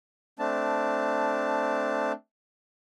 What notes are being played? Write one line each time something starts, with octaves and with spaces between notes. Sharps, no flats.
A3 C4 D4 A5